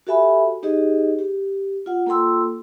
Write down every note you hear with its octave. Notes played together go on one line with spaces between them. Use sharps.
F#4 G4 A4 E5 G#5 B5
D#4 G4 G#4 D#5
G4
F4 F#5
A#3 F4 A4 G5 C6 E6